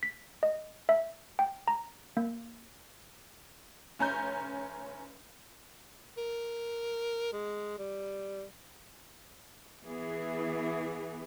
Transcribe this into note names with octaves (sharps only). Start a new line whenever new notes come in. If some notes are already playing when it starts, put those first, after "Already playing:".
B6
D#5
E5
G5
A#5
A#3
F1 C#4 A#5 G6
A#4
G#3
G3
E3 B3 G#4